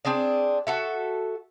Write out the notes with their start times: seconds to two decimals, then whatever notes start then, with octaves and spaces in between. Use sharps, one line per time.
0.05 C4 D4 G#4 D5
0.67 F#4 A4 E5